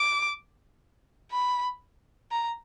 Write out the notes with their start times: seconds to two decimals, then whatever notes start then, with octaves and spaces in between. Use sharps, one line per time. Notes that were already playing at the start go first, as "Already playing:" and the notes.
Already playing: D6
1.31 B5
2.31 A#5